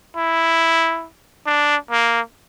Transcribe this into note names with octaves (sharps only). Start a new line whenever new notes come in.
E4
D4
A#3